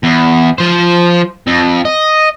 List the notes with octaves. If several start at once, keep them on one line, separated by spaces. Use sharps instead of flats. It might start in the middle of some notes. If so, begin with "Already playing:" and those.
E2
F3 C5
F2
D#5